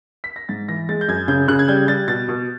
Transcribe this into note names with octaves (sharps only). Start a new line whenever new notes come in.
B6
A#6
G#2 A6
E3 A#6
G#3 A6
G6
F#2 G#6
C#3 G6
C#3 F#6
G#6
G3 G6
G3 A6
B2 A6
B2